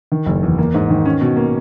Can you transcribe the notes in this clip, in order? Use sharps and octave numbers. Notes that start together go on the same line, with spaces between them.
D#3
F#1
E2
A#3
G#2
D#3
C#4
B2
A#3